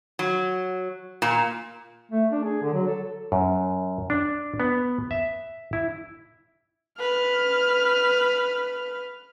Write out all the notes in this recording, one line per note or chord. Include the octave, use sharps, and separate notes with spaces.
F#3
A#2
A3
D4
G#4
D3
F#3
A4
F#2
D4
B3
E5
E4
B4 F6